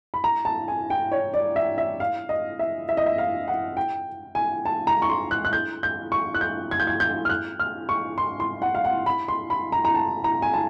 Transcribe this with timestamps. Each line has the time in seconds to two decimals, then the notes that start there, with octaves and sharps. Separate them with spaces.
0.14 B5
0.24 A#5
0.45 A5
0.68 G#5
0.90 G5
1.12 C#5
1.34 D5
1.56 E5
1.78 E5
2.00 F5
2.29 D#5
2.59 E5
2.89 E5
2.97 D#5
3.06 E5
3.18 F5
3.48 F#5
3.77 G5
4.35 G#5
4.65 A5
4.87 A#5
5.02 C#6
5.09 C6
5.31 F#6
5.45 F#6
5.53 G6
5.83 G6
6.12 C#6
6.35 F#6
6.41 G6
6.71 G#6
6.80 G6
6.87 G#6
7.00 G6
7.25 F6
7.29 F#6
7.60 F6
7.89 C#6
8.18 C6
8.40 C6
8.62 F#5
8.75 F5
8.85 F#5
9.06 B5
9.28 C6
9.50 B5
9.72 A#5
9.85 A#5
9.95 A5
10.24 A#5
10.42 G#5
10.54 A5